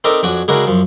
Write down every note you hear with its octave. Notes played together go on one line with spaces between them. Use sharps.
C4 D#4 A4 A#4 D5 E5
F2 D4 F#4 C#5 G#5
C#3 G#3 D4 E4 F#4 A#4
F#2 F3